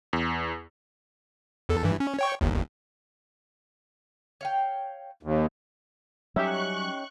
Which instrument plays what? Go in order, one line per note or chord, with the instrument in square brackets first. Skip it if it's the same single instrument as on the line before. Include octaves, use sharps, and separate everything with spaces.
[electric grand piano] E2
[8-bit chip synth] E2 A4
G2 E3
C#4
C#5 G5 C#6
G1 D#2
[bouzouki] C#5 F5 G5
[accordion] D#2
[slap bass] F#3 G3 [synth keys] C#4 D#4 G4 [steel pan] E5 [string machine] C#6 F#6